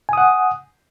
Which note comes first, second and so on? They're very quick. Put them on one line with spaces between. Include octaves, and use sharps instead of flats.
G#5 D#6 F#5